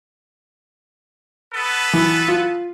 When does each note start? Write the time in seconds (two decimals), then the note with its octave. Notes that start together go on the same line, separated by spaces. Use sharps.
1.54 B3 A4 B4
1.93 E3
2.28 F4